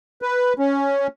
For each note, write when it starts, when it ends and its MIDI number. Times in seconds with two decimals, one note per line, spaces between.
0.22 0.53 71
0.59 1.07 61